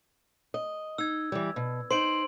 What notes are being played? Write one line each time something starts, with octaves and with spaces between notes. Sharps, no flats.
D#5
D#4 E6 G#6
E3 G3
B2
D#4 C5 C6 D7 F#7